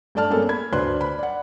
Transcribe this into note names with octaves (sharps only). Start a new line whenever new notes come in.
G2 A3 D5 A5 F6
G#3 A#3 B3 C#4 A4
B5 G#6
D2 D4 B4 C5 C6 F#6
B5
D5 F#5